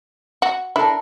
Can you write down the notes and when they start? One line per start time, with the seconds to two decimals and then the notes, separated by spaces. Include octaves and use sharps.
0.42 F#4
0.76 D4 E4 A4 A#4